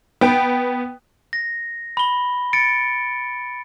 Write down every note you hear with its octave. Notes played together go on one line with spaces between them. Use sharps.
B3 G5
A#6
B5 G7
A6 C#7 D7